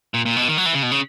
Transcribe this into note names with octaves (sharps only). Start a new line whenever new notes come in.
A#2
A#2
B2
D#3
F#3
E3
C#3
B2
C#3